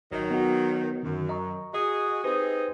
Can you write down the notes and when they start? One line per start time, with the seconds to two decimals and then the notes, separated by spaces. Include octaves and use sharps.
0.12 A1 D#3 F#3 C#5 D#5
0.30 B3 F#4
1.03 F#2 D3 D#3
1.29 D#5 A#5 C#6
1.74 F#4 G#4 D#5
2.24 C4 D#4 G4 G#4 B4 C5